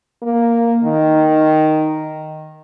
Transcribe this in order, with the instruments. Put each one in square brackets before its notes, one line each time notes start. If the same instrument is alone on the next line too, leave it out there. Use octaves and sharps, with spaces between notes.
[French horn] A#3
D#3